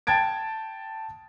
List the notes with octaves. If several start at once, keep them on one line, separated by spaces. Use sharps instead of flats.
G5 A5 G#6 A6 D7